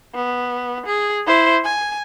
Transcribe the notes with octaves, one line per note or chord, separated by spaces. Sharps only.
B3
G#4
E4 C5
G#5